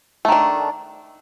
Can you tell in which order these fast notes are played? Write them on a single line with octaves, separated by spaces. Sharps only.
A3 D#3 D4